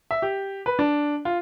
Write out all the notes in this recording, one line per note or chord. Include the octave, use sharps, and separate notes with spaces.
E5
G4
B4
D4
F4